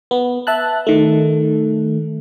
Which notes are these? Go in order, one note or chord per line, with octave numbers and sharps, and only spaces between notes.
B3
E5 A5 F#6
D#3 A3